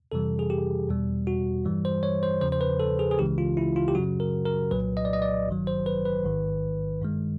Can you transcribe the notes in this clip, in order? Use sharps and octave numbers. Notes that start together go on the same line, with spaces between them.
F2 C3 E3 G3 A4
G#4
G4
E2 B2 G3
F#4
G2 E3 G3
C5
C#5
C5
E2 C#3 F3 C5
C5
B4
A4
G#4
G#4
C#2 C#3 E3 G#3 G4
F4
E4
F4
G4
F#2 C#3 F#3 F#4
A#4
A#4
C2 A#2 F#3 B4
D#5
D5
D#5
D5
G#1 G2 D#3 F#3
C5
B4
B4
A1 G#2 D#3
G2 D#3 G#3